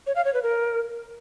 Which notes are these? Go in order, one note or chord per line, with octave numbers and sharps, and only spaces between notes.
C#5
F5
C#5
B4
A#4